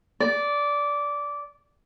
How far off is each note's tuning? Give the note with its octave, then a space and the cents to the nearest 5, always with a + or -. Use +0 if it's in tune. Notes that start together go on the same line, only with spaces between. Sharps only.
D5 -15